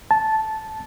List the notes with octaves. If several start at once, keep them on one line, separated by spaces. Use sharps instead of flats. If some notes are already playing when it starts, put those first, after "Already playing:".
A5